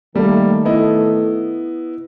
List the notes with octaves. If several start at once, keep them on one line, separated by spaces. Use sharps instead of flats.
D#3 G3 A3 A#3 A4
B3 E4 D#5